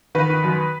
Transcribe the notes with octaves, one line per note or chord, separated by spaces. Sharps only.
D#3 B4
D#3
F#2